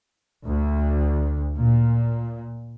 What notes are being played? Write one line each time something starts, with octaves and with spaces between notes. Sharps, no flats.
D2
A#2